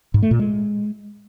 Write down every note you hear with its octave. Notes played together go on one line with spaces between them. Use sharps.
G#2
A3
A#2
G#3